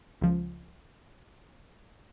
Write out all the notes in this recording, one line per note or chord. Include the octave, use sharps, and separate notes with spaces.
C#2 F3